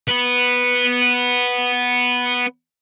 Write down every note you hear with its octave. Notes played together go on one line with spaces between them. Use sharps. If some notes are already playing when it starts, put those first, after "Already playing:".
B3 B4